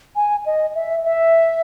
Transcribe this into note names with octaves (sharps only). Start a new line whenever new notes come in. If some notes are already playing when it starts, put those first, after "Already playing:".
G#5
D#5
E5
E5